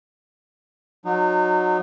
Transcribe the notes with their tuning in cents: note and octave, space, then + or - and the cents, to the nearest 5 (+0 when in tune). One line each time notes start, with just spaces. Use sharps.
F#3 -25 D#4 -30